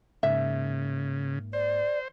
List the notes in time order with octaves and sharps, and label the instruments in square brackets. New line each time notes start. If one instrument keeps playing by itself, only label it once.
[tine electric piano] G#2 A#3 [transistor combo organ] C#3 [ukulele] E5
[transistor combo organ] C5 [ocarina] D5